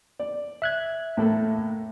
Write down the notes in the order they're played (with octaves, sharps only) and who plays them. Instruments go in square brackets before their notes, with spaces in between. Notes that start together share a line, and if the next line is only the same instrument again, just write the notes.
[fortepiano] D5
[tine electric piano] E5 F#6 G#6
[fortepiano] A2 A#3 A4